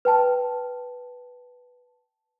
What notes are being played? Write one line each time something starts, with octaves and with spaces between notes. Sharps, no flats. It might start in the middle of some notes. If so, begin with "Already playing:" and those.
B4 G5 A5